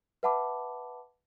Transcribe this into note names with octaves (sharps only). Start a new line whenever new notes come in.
B4 E5 F#5 A5 B5 D6